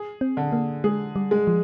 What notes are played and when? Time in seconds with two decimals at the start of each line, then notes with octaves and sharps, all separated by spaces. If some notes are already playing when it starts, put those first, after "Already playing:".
Already playing: G#4
0.21 C4
0.37 D3
0.53 A#3
0.84 G#3 G#4
1.16 G3
1.31 G#3
1.47 F3